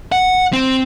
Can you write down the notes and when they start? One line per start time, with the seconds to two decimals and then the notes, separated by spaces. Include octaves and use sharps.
0.12 F#5
0.53 C4